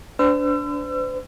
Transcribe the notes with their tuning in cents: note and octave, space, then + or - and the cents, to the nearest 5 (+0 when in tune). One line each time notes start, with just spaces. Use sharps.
D4 -20 C5 -45 E6 +35